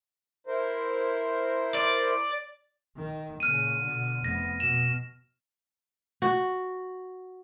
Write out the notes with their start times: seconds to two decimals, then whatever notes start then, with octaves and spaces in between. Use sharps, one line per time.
0.47 E4 A#4 C5
1.75 D5
2.97 D#3
3.40 A#2 C#3 F6 D#7
3.81 B2 D3
4.24 F1 B3 A#6
4.60 B2 E7
6.22 F#4